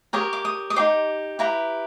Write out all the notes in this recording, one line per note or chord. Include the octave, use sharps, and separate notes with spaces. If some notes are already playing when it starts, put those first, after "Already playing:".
G4 A#4 C#5 D#6
D6
D#6
D#6
D#4 G4 C5 D6
E4 G4 B4 A#5